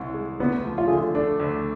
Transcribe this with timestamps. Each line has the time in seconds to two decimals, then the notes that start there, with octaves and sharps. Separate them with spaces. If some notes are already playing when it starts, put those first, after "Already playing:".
Already playing: C2 C4
0.14 G#3
0.40 D2 B3
0.65 F3
0.78 F4
0.87 D3 G#4
0.98 F4
1.14 A3 D4
1.40 D2